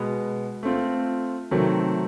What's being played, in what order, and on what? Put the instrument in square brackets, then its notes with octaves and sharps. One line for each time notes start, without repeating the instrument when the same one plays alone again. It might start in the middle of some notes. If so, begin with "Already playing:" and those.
Already playing: [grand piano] B2 G#3 B3
A3 C4 F4
C3 D#3 F#3 A3 C4